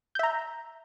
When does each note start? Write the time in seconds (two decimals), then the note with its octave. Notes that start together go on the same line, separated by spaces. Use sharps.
0.15 G6
0.19 E5
0.23 A#5